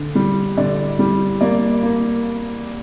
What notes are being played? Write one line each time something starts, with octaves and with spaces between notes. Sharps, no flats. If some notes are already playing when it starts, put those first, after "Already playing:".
Already playing: D3
G3
D3 D5
G3
A#3 D5
A#3